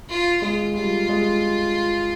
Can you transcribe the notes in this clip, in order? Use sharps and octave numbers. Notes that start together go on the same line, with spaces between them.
F4
G#3 F4
G3 F4
G#3